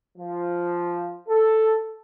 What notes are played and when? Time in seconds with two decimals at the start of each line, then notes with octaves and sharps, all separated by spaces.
0.17 F3
1.28 A4